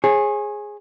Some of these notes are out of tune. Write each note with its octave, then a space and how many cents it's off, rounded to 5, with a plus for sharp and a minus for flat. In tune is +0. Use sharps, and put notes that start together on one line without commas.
G#4 +0 C#5 -40